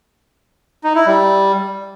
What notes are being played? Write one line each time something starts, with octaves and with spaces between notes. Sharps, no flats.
D#4
E4
G3